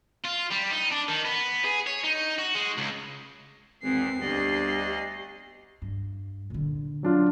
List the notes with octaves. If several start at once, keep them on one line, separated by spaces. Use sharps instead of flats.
F4
G3
D#4
D4
D#3
B3
G#4
C#5
D#4
F#4
G#3
C#2
G#1 E2 E3 C4 C7
G1 D2 G4 D5 D#5
G2
A#2 D3
F#3 D4 F4